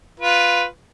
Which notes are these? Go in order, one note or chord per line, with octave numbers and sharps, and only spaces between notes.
F4 B4